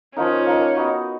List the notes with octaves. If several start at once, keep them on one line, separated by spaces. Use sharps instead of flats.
F3 A#3 C#4 D#4
A#3 D#4 A#4
B3 D#4 F#4